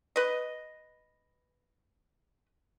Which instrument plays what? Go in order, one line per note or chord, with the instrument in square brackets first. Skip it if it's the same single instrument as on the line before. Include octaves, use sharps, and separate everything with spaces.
[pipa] B4 D#5